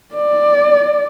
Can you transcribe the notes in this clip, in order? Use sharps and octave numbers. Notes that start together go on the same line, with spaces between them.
D5